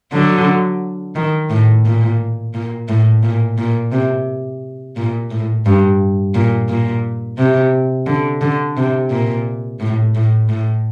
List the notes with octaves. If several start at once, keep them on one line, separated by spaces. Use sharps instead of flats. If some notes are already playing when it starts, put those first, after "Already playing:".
D3 F#3
D#3
A2
A#2
A#2
A2
A#2
A#2
C3
A#2
A2
G2
A#2
A#2
C3
D3
D3
C3
A#2
A2
A2
A2